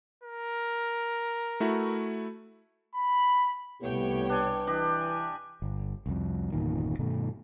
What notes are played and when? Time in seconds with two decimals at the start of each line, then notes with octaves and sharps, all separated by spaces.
0.23 A#4
1.60 A3 E4 F#4
2.95 B5
3.82 C2 A2 B3 G4 C#5 G5
4.29 D4 B4 G#5
4.67 E3 D4 G4 D#5
4.99 G#5
5.62 G1
6.06 C2 F2
6.52 G1 E2 A#2 D#3
6.99 G2 B2 D#3 A3